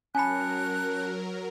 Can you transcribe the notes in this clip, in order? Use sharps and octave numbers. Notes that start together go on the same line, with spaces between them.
F#3 C#4 A#4 G#5 A5 B5 F#6 C#7